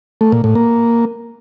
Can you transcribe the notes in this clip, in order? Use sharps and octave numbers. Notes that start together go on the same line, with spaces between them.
A3
A#2
A2
A#3